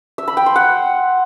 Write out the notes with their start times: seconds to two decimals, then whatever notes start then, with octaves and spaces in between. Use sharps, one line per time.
0.18 E5
0.28 B5
0.37 G5
0.46 C6
0.56 F#5